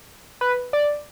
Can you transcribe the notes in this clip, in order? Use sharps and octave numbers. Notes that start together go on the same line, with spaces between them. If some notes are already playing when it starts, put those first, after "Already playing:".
B4
D5